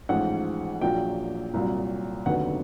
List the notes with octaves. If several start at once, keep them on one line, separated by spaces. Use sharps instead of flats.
A1 G#2 F3 F#5
A#1 A#2 F#3 G5
C2 A#2 F#3
F1 D#2 D3 F#3 B3 F#5